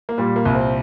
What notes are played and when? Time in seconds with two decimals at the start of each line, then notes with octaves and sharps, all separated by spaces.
0.09 A#3
0.18 A#2 G3
0.36 A#3
0.45 C2
0.54 C4